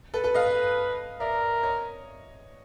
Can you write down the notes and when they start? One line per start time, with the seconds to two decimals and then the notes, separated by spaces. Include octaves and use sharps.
0.14 A4 B4
0.24 A4 B4
0.34 B4 D#5 F5
1.20 A#4 D5 E5
1.63 C#5 D#5